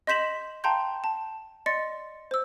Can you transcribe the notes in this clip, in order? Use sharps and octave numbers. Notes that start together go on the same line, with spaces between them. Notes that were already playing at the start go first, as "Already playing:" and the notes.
D#5 C6 G6 B6 E7 F#7
F5 G5 A5 A#5 C6 G6
A5
D5 D#5 C6 A6 C#7
C5 E6